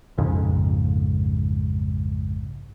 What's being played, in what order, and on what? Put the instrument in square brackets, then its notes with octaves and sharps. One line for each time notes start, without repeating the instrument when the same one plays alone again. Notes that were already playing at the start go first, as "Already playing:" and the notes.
[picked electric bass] A#1 F2 G#2 C#3